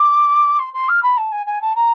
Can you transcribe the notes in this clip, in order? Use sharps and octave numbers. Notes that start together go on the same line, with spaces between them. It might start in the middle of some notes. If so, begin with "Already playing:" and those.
Already playing: D6
C6
C6
F6
B5
A5
G#5
G#5
A5
A#5